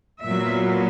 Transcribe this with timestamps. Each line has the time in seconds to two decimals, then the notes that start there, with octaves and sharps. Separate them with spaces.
0.23 A#2 F#3 B3 E5